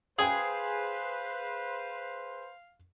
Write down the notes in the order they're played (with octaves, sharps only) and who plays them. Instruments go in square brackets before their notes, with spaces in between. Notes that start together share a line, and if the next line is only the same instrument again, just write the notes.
[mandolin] G#4 [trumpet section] B4 C5 [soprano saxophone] F5 [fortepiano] G5 G#5 D#6